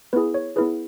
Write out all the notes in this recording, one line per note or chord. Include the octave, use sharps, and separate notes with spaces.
B3 E4 G#4 B4
C#5
B3 E4 G#4 B4